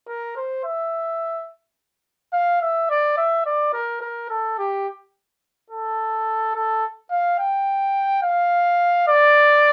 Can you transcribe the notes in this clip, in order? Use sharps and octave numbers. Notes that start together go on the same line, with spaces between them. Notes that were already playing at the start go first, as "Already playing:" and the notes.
A#4
C5
E5
F5
E5
D5
E5
D5
A#4
A#4
A4
G4
A4
A4
F5
G5
F5
D5